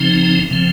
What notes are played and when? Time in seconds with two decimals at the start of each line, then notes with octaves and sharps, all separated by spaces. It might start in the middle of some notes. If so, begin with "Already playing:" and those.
Already playing: C#3 F3 C4 D#4
0.51 C#3 F3 C4